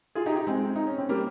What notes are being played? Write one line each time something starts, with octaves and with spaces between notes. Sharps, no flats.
F4 G#4
D#4 G4
D#4 G4
G#3 C4
D#4
C#4
C4
G3 A#3